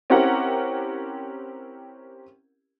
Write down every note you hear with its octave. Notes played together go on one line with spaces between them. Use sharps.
C4 C#4 E4 G4 A#4 F#5